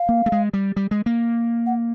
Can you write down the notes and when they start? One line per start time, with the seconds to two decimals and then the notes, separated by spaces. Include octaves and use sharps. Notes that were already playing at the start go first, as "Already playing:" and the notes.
Already playing: F5
0.09 A#3
0.26 A3
0.32 G#3
0.53 G3
0.76 G3
0.91 G#3
1.06 A#3
1.66 F#5